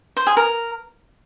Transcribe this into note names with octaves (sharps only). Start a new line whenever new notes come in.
C5
G#4
A#4